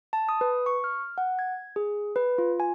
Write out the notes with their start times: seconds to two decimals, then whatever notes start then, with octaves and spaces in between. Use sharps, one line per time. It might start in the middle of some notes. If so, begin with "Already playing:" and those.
0.13 A5
0.29 D#6
0.41 B4
0.66 C#6
0.84 F6
1.18 F#5
1.39 G#6
1.76 G#4
2.16 B4
2.38 F4
2.60 G#5